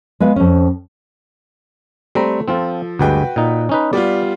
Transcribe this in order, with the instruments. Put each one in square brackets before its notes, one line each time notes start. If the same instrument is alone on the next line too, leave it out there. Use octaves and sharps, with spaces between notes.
[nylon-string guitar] G#3 B3 B4 F5
F2 C#4
[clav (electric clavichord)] G3 C4 A#5 [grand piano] A3
[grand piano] F3 A4 [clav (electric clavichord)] C4 F4
[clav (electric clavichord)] D2 G2 G#3 [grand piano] F#4 B4 G5
[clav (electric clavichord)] A#2 D#4
C#4 D#4 B4
[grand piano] G3 B3 F4 [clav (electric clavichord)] D5